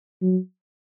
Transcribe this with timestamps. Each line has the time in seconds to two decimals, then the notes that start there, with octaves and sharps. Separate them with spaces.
0.22 F#3